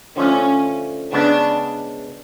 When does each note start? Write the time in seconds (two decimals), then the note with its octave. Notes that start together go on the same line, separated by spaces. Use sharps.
0.16 D3 F3 A3 C#4 F4
1.13 C#3 G#3 B3 D4